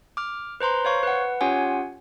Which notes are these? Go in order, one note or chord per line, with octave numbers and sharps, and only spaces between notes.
D6 F6
B4 C5 A#5 C6
C5 C#5 F5 C#6
B4 F#5
C#4 F4 G4 C#5 F#5 G#5